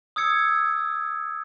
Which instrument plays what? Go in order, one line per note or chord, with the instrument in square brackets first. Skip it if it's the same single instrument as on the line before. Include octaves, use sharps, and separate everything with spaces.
[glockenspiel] D#6 E6 G#6 C#7